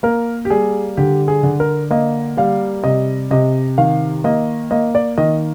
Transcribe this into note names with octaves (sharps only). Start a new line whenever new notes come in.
A#3 A#4
G4
G3 G#4
D3 G4
G#4
D3
A#4
A#3 D#5
G3 F5
C3 D#5
C3 D#5
D#3 F5
A#3 D#5
A#3 D#5
D5
D#3 D#5